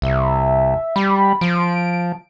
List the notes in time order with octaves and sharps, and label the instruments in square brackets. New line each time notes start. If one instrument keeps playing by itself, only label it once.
[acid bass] C2 [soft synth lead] E5
[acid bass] G3 [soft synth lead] B5
[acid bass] F3 [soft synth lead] D7